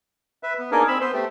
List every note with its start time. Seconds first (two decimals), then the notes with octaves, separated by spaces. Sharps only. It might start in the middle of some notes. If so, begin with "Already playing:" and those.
0.43 B4 E5
0.58 B3
0.72 A#3 D4 D#4 G#4 A#4
0.88 C4 B5 E6
1.01 B3 C5
1.13 A3 G4 A4